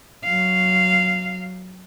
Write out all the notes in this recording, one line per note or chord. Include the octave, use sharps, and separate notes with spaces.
F#3 F5